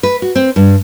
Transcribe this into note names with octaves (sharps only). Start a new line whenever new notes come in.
B4
F#4
C4
G2